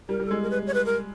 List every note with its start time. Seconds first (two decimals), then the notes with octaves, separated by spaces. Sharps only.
0.09 G3 A#4
0.20 G3
0.26 A4
0.31 G#3
0.43 A#4
0.51 B4
0.67 C#5
0.74 B4
0.86 A#4